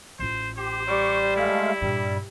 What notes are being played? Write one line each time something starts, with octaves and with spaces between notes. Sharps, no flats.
A1 F4 C5
G4 C5
G3 C#6 D6
G#3 A3 E4 F5
G2 A#2 G3